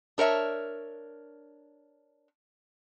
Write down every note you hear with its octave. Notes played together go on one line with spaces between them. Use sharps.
D4 A#4 C#5 E5